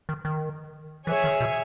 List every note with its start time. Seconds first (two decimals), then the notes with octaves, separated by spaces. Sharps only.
0.09 D#3
0.25 D#3
1.07 E3 G#4 C#5 E5 G#5
1.24 D#3
1.41 B2